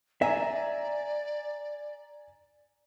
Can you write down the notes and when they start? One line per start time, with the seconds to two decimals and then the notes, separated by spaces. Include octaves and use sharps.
0.22 D5 E5 G#5 A#5 D#7